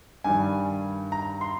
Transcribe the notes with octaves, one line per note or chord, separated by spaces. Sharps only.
G2 D#3 G3 G#5
A#5
C6